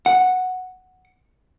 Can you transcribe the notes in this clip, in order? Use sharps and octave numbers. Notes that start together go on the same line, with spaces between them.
F#5